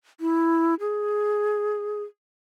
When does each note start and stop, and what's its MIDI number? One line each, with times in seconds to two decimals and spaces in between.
0.20 0.75 64
0.80 2.03 68